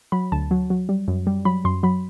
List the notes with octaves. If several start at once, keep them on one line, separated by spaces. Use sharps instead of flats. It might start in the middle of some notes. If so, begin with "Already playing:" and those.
F#3 B5
D2 A5
F#3
F#3
G3
F#2
G3
F#3 B5
F#2 C6
F#3 B5